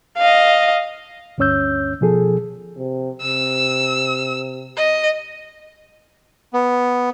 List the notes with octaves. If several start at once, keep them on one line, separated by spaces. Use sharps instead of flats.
D#5 F5
D2 G2 C#4 C#5 E6 G6
B2 F3 G#4 A4
C3
C3 E6
D#5
B3